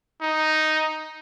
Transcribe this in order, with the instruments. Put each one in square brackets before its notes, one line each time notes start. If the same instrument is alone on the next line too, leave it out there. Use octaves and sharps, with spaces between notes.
[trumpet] D#4